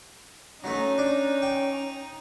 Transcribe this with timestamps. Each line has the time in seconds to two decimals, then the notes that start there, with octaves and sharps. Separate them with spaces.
0.64 F#3 A3 C#4 D#4
0.98 D4
1.42 G5